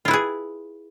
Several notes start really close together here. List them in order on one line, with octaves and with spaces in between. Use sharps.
F4 E4 B4 G#4